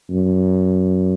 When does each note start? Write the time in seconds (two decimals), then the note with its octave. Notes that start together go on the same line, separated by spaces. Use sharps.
0.11 F#2